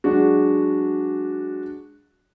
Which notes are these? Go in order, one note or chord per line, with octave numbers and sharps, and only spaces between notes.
F#3 G#3 D4 F#4